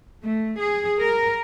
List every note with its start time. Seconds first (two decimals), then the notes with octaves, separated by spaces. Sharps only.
0.24 A3
0.60 G#4
1.01 A#4